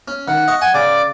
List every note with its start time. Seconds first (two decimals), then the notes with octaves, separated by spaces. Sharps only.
0.08 C#4
0.28 D#3 F#5
0.48 D#5 C#6
0.62 F#5 G#5
0.74 C#3 D5 D6